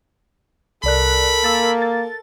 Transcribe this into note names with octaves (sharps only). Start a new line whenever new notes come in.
C2 A4 A#4 D5 B5 F#6
A#3 E6 A6
A6